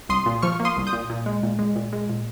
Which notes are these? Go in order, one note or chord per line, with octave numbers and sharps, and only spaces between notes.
C2 C6 D#6
A#2
F3 C#6 F6
A#3
C6 D#6
C2
D#6 G6
A#2
A#2
G#3
A#2
G#3
A#2
G#3
A#2